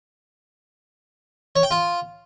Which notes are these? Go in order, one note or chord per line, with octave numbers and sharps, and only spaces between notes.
C#5
G5
F4